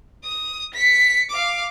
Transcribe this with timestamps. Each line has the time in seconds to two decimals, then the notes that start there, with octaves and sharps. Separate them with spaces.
0.24 D#6
0.74 B6 C#7
1.30 F5 D6